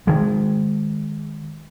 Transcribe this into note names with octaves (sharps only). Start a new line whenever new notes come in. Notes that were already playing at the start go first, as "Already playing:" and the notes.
D#3 G#3